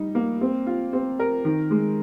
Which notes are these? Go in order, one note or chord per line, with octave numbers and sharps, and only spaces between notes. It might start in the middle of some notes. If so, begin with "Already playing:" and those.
Already playing: G3 D#4
A#3
C4
F4
C4
A#4
D#3
G#3